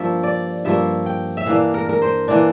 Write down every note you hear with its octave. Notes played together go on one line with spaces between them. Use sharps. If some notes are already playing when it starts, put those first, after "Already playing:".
Already playing: G2 F3 A#3 E5
D5
G2 F3 A#3 E5
G5
E5
E3 A#3 D4 F5
A#4
A#4
C5
E3 A#3 D4